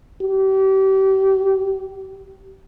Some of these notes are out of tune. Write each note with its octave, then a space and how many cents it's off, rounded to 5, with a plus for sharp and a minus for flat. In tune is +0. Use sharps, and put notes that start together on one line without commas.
G4 -30